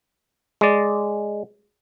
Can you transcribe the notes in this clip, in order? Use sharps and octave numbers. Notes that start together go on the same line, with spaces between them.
G#3 D5